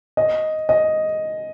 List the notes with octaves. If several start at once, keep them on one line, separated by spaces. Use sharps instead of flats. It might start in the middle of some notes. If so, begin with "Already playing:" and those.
D#5
D#5